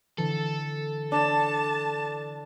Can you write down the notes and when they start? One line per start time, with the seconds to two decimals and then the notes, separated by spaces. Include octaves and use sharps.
0.18 D3 E3 A4
1.12 D4 A5